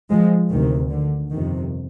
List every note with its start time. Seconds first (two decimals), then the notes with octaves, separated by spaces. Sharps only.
0.11 F3 G#3
0.50 D2 C3 D#3
0.90 D3
1.31 G1 F2 C3 D#3